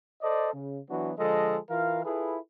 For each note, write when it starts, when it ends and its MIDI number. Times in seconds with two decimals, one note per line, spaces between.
0.22 0.53 69
0.22 0.53 72
0.22 0.53 74
0.22 0.53 75
0.53 0.79 49
0.90 1.12 52
0.90 1.12 54
0.90 1.12 59
0.90 1.12 62
0.90 1.12 66
1.18 1.57 50
1.18 1.57 53
1.18 1.57 56
1.18 1.57 69
1.18 1.57 75
1.70 2.05 52
1.70 2.05 65
1.70 2.05 70
1.70 2.05 77
2.05 2.37 64
2.05 2.37 65
2.05 2.37 68
2.05 2.37 69
2.05 2.37 71